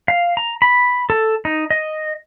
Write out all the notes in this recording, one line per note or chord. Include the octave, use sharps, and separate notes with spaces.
F5
A#5
B5
A4
D#4
D#5